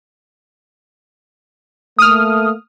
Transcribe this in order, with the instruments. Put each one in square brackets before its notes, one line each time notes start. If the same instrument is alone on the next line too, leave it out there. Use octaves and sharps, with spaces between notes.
[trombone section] A3 A#3 [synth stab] D#6 F6